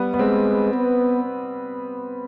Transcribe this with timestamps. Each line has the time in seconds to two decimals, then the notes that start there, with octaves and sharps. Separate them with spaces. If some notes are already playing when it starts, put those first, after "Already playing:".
Already playing: G3 B3
0.14 B3
0.19 G#3 C4
0.74 B3